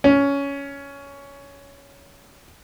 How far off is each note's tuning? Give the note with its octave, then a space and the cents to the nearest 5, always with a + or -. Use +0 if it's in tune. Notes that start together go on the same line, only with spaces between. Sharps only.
C#4 +15